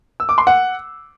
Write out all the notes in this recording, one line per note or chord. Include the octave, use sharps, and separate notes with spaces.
E6
D6
C6
F#5